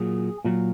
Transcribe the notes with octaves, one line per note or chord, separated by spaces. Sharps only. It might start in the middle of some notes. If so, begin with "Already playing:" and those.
Already playing: A#2 F#3 G#4
A#2 F#3